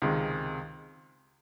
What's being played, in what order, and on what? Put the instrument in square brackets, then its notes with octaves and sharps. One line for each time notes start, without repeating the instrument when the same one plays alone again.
[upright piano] C#2 C3 D#3 G#3